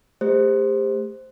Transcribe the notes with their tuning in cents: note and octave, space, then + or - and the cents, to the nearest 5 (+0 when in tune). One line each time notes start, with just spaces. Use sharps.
A3 +0 G4 +35 C5 +0